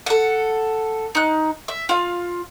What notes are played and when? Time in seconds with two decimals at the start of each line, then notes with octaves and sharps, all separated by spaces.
0.06 A4 F#5
1.15 D#4 F#6
1.68 E5
1.89 F4 F5